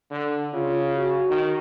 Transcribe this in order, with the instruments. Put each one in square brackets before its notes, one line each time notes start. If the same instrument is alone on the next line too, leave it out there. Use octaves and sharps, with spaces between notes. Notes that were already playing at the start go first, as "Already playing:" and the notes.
[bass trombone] D3
[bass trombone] C#3 [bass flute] F4
[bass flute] F#4
[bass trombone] D#3